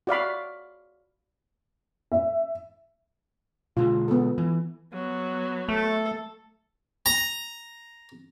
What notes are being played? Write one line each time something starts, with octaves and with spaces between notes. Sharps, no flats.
F#4 D5 F5 B5
E5
B2 D3 G#3 F4
B3 A4
E3
F#3 B3
A3 A4
A#5